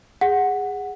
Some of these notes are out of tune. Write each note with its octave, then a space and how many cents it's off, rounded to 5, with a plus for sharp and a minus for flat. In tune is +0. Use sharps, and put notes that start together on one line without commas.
G#4 -20 F#5 +0